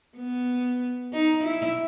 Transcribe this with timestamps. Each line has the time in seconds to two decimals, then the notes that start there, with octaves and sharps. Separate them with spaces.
0.17 B3
1.13 D#4
1.44 E4